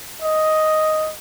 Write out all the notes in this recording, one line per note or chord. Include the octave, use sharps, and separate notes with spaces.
D#5